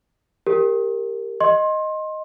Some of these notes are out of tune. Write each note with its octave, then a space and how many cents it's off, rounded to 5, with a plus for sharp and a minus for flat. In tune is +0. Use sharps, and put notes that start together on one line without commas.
G4 +15 A#4 -10
D#5 +0 C6 +25